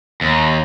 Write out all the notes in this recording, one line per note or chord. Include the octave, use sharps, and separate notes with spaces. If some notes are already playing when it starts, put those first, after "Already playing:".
D#2